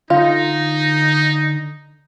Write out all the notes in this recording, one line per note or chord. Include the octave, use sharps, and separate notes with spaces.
D3 D#4 F4